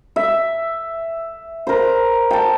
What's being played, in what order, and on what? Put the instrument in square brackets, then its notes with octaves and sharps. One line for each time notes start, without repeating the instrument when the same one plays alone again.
[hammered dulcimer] E5
A#4 C5
G5 A5